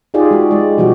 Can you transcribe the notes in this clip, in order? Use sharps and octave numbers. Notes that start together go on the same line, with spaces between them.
D#4 F4 G4 G#4 D5
G#3 F#4
G#3 D5
B2 F3 G3 F#4 G4